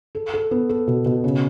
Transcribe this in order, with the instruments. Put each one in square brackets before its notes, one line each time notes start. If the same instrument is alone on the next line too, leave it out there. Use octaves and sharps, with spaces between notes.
[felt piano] A4
A4
B3
A4
B2
B2
C#3